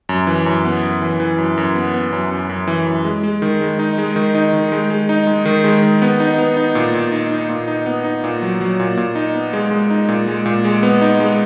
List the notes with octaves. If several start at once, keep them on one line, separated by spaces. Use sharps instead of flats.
F#2
E3
F#2
B3
F#2
E3
E3
F#2
F#2
B3
B3
F#2
F#2
F#2
E3
F#2
G#3
G#3
D#3
G#3
D#4
G#3
D#3
D#4
D#3
G#3
G#3
D#4
G#3
D#3
G#3
D#3
B3
D#4
B3
D#4
A#2
A#2
D#4
D#4
A#2
D#4
B3
D#4
A#2
F#3
F#3
A#2
A#2
D#4
B3
G#3
G#3
D#4
A#2
G#3
A#2
G#3
B3
D#4
G#3